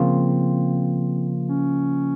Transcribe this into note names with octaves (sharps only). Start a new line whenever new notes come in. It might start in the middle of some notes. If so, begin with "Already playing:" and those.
Already playing: C#3 F3 A#3 C4 F4
C#4